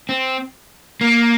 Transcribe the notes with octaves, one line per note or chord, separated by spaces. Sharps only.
C4
A#3